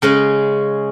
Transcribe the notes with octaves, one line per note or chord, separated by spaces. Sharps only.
C#3 G#3 C#4